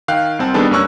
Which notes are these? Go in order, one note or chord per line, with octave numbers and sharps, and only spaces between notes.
D#3 F5 G5 F6 F#6
C2 C4 A5
D#3 G3 B3 D4 G#4 A4
G2 A#3 C#4 C#6 E6 F#6